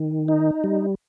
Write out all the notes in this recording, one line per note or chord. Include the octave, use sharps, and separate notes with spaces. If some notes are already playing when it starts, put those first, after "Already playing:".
Already playing: D#3
D#4
G3